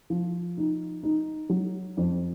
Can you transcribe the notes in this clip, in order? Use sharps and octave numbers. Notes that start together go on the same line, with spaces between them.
F3
D#4
D#4
F#3
F2